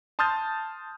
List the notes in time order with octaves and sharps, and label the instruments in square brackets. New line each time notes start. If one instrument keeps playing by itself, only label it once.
[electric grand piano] A5 C6 D#6 F6 G6 A6